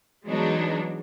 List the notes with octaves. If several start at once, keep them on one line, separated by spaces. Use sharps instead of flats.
E3 F#3 G#3 B3 D4 D#4